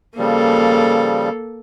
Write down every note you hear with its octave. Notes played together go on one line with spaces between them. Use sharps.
C#3 F3 G3 A#3 A4